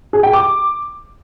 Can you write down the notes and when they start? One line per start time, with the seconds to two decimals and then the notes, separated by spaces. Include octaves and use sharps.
0.13 G#4
0.23 G5
0.33 D6